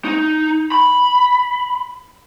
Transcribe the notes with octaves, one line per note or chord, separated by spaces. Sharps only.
D#4
B5